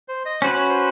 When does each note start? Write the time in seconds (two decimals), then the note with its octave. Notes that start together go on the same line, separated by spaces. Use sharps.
0.08 C5
0.25 D#5
0.42 C#4 F#4 B4 C5
0.55 C#5
0.69 C5